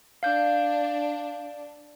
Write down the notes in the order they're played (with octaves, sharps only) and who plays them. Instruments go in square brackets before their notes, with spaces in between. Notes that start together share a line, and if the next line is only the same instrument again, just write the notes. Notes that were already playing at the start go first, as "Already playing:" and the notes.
[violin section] D4 [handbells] F5 G6